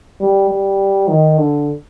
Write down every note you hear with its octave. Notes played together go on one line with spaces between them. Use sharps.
G3
G3
D#3
D3